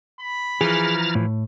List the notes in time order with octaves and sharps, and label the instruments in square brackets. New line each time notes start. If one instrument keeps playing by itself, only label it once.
[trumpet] B5
[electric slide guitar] E3 F3 [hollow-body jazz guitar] G#4 [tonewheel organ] A#5 F6 A6
[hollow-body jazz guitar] A2